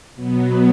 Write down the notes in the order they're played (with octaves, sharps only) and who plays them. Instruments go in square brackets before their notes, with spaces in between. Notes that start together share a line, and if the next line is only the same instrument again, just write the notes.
[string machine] B2 F#3 B3